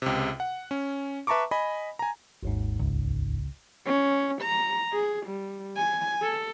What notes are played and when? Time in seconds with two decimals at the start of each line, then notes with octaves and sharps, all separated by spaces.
0.02 C#2 C3
0.40 F#5
0.71 C#4
1.27 B4 E5 A5 A#5 C#6 D6
1.51 D#5 G#5 B5
1.99 G#5 A#5
2.43 G#1 D#2 G#2
2.79 C#2
3.86 C#4
4.42 A#5
4.93 G#4
5.27 G3
5.76 G#5
6.22 A4